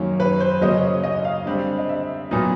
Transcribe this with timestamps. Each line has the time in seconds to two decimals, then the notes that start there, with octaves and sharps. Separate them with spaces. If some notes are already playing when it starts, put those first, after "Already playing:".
Already playing: F#2 D#3 F#3 A#3 C#4
0.20 B4
0.40 C5
0.61 C#3 F#3 A#3 C#4 D#5
1.03 D#5
1.25 F5
1.46 D3 G3 C4
1.78 D#5
1.89 E5
2.31 A#2 F#3 B3 D#4